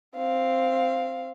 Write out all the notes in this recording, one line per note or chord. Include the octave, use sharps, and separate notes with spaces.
C4 F5